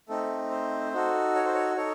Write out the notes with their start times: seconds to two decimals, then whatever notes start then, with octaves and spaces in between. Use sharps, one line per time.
0.09 A3 C4 D#4 A4
0.51 C5
0.93 D#4 F#4 A4
1.36 C#5
1.45 C5
1.54 C#5
1.77 D#4 A4 C#5